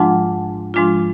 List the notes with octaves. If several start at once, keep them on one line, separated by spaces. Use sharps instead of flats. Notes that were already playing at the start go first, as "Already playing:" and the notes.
Already playing: G#2 F3 G#3 D4 F4 F#5 A5
G#2 F3 G#3 D4 F4